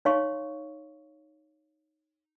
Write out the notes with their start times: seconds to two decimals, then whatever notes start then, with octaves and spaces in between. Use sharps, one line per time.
0.05 D#4 C#5 F5 C6 C#6